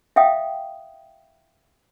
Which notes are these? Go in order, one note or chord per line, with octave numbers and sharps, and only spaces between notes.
E5 F5 G5 D#6